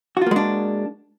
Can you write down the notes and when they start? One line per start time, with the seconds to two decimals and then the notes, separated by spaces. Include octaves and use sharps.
0.17 F#4
0.22 F4
0.26 A#3
0.31 G#3
0.36 D4